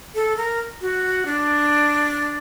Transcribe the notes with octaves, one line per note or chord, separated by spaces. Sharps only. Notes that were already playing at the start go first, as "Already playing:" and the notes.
A4
A#4
F#4
D4